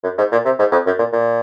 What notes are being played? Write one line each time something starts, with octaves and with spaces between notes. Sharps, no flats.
F#2
G#2
A#2
C3
G#2
F2
F#2
A#2
A#2